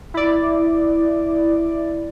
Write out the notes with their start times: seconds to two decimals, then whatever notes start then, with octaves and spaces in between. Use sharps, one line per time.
0.14 E4 D5